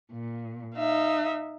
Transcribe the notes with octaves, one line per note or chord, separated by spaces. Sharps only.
A#2
D#4 E5 F5